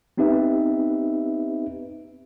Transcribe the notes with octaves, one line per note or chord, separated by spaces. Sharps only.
B3 C4 D#4 G4 B4 E5